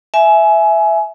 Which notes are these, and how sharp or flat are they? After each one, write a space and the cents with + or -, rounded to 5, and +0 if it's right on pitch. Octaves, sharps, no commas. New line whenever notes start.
E5 +0 G#5 +20